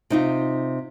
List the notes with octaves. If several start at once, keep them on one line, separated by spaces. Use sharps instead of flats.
C3 D#4 F4